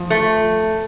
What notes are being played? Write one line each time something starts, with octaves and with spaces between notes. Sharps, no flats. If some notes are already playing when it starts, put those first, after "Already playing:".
Already playing: F3
A3